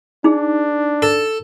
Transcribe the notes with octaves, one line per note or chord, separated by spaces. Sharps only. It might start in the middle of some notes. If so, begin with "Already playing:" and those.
D4 D#4 G#4
A4